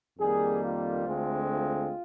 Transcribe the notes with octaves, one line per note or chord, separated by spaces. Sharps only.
F2 D#3 G3 A#3 G#4
F4
D2 D3 G#3 C4
F4